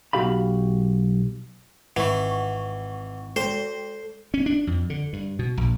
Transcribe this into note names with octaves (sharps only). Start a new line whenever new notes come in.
B1 F#4 G4 F5 B5
G#1 E3 F#5 C#6
G#3 A4 C5
C#4
D4
F2
D3
G2
B2
A#1